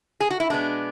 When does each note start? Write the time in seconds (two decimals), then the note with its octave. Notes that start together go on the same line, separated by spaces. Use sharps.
0.20 G#4
0.30 F#4
0.40 E4
0.50 B2 G#3 B3 D4